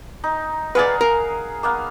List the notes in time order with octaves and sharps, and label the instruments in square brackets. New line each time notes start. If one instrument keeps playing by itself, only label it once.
[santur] D#4
[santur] G#4 F5 F#5 [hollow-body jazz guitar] B4 D5
[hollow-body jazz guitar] A#4
[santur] A#3 B3 F5